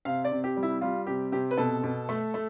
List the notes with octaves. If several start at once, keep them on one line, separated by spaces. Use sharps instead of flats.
C3 F5
D5
C3
G4
G3
E4
G3 F4
C3 G4
C3 G4
B4
B2 A4
B2
A3
A3